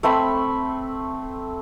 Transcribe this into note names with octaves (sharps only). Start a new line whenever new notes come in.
A3 C4 B5 E6